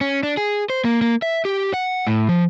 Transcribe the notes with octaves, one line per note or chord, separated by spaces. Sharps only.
C#4
D4
G#4
C5
A#3
A#3
E5
G4
F#5
A2
F3